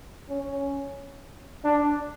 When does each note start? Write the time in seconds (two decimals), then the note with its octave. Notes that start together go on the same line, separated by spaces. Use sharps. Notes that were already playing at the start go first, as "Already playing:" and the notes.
0.29 C#4
1.65 D4